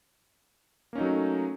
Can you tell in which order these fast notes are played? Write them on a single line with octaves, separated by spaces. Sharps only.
A#3 C#4 D#4 F#3 A3